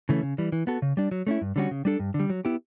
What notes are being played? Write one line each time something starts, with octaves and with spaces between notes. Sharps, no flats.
C#3 E3 A3 C#4
C#3
E3 G3
E3
B3 F#4 A4
C#3
G3 D4
F#3
A3 C#4 E4
G2
D3 G3 C#4 F#4
C#3
G3 D4 A4
G2
D3
G3
F#3
B3 E4 G4